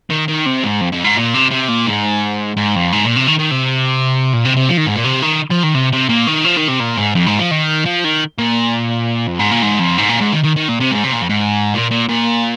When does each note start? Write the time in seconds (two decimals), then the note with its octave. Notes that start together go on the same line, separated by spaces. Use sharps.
0.10 D#3
0.28 D#3
0.46 C3
0.64 G#2
0.81 F2
0.92 F2
1.04 G#2
1.17 A#2
1.34 C3
1.51 C3
1.69 A#2
1.87 G#2
2.57 G#2
2.75 F2
2.92 G#2
3.05 A#2
3.16 C3
3.27 D#3
3.39 D#3
3.51 C3
4.33 A#2
4.45 C3
4.57 C3
4.69 F3
4.77 D#3
4.86 G#2
4.96 A#2
5.04 C3
5.22 D#3
5.50 F3
5.63 D#3
5.74 C3
5.93 C3
6.09 A#2
6.27 D#3
6.45 F3
6.57 D#3
6.68 C3
6.80 A#2
6.97 G#2
7.15 F2
7.27 G#2
7.39 F3
7.51 D#3
7.85 F3
8.04 D#3
8.39 A#2
9.27 F2
9.39 G#2
9.51 A#2
9.62 G#2
9.79 F2
9.98 G#2
10.09 A#2
10.21 G#2
10.33 D#3
10.44 D#3
10.56 D#3
10.69 A#2
10.80 C3
10.91 G#2
11.04 C3
11.12 A#2
11.21 F2
11.29 G#2
11.74 A#2
11.91 A#2
12.09 A#2